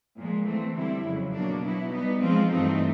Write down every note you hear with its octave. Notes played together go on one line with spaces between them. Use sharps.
A#2 F3 G#3
E3 A3 C4
D3 G3 C4 E4
F2 C#3 F#3
B2 F#3 A#3 D4
B2 F#3 B3 E4
G3 B3 D#4
F3 G#3 C4 F4
G2 E3 A3 C4 D#4